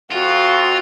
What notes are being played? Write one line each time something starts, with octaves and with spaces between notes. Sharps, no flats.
F2 F4 F#4